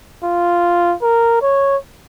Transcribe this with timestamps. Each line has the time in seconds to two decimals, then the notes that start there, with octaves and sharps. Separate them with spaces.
0.23 F4
1.02 A#4
1.42 C#5